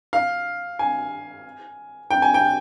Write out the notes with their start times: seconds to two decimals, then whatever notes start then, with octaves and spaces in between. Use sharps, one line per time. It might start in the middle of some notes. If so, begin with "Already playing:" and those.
0.13 F5
0.79 G#5
2.10 G5
2.22 G#5
2.34 G5